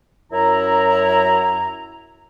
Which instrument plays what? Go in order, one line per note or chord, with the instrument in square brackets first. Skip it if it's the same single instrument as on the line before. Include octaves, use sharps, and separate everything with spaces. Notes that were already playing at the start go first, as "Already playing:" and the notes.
[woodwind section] F#2 E4 A#5